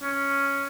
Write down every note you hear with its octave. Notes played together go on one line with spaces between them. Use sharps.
C#4